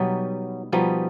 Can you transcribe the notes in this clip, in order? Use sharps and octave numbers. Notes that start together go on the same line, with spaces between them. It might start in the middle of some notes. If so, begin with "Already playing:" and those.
Already playing: B2 F#3 G3 B3 D#4
B2 F3 G3 B3 D#4